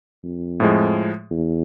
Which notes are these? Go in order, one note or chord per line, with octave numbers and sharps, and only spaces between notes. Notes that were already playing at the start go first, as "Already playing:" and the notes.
F2
A2 F3 G#3
E2